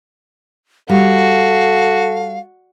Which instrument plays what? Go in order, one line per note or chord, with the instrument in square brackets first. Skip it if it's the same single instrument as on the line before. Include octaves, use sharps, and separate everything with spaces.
[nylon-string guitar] G3 [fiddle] F#4 [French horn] A4 [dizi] F5